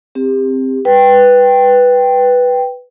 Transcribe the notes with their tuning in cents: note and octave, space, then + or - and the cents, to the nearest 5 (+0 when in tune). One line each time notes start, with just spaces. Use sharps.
C4 +0 G4 +30
B4 +0 G5 +0